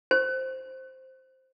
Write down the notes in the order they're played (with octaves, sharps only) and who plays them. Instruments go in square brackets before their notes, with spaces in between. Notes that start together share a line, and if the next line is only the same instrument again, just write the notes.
[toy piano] C5